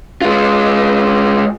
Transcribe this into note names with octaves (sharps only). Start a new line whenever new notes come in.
G#3 F4